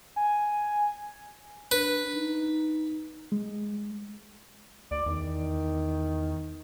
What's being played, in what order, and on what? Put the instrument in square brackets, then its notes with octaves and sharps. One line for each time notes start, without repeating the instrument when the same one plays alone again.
[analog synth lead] G#5
[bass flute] D4 [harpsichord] B4
[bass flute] D#4
[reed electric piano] G#3
[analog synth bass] D2 [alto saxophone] D5
[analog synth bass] E2 [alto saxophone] D#3